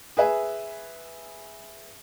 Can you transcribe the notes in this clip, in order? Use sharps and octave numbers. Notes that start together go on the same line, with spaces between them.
G#4 B4 E5 G#5